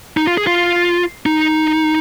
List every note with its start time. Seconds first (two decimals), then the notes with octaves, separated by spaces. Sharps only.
0.17 D#4
0.27 F4
0.37 G#4
0.47 F4
1.26 D#4